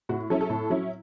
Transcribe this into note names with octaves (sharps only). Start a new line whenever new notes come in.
A2 F#4
F#3 C#4 E4 A4
A4
A2
F#3 C#4 E4